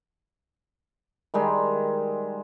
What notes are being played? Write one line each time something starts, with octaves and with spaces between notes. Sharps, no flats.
D#3 G3 G#3